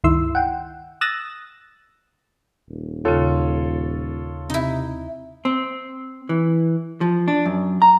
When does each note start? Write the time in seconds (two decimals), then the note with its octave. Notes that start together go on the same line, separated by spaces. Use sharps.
0.04 C#2 G2 D#3 E4 C6 E6
0.35 F#5 G5
1.01 D#6 E6 F#6 A6 A#6 E7
2.69 D#1
3.05 D#2 C#3 F4 A4 C#5
4.50 C3 D#4 E4
5.45 C4
6.29 E3
7.01 F3
7.28 D4
7.46 F#2
7.82 A#5